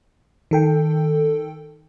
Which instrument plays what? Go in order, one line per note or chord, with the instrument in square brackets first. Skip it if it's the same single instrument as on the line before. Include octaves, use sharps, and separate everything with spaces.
[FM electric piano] D#3 A4 G5